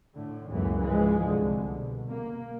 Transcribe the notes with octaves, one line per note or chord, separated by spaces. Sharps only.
A2 D3
C#2 F#2 A2 E3 A#3
G#2 E3 F3 G#3
C2 D3
B2
A#3